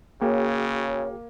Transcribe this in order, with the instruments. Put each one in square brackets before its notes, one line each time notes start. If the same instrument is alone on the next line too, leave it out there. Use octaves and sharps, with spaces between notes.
[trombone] C#3 [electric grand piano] A#3 [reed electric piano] F#4 G#4 G5 [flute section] C#5